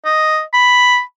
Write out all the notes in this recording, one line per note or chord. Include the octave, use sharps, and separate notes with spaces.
D#5
B5